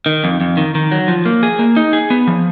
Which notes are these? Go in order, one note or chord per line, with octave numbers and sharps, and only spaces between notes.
D#3
F2
F2
D#3
D#3
F#3
F3
A#3
G#4
A#3
D#4
G#4
B3
F3